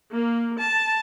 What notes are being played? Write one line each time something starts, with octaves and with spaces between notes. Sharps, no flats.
A#3
A5